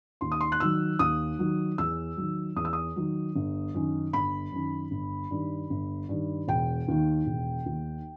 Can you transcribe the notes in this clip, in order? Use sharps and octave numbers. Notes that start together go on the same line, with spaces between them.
D#2 C6
D#6
C6
F#6
D#3 F#3 E6
D#2 D#6
D#3 F#3
E2 E6
D#3 F#3
E2 D#6
E6
D#6
D#3 F#3
G1
F#2 D#3
G1 B5
F#2 D#3
G1
G2 D#3
G1
G2 D#3
E1 G5
D#2 D#3
E1
D#2 D#3